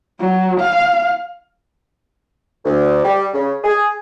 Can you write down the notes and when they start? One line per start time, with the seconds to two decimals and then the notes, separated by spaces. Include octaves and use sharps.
0.20 F#3
0.60 F5
2.65 D2
3.03 G3
3.34 C#3
3.64 G#4